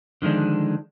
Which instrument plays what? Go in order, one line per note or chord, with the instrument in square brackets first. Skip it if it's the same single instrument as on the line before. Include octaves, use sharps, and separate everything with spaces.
[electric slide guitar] D3 D#3 F3 G#3 D4